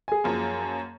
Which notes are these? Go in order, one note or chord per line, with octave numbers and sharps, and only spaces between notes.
G#4 G#5
F#2 F3 A#3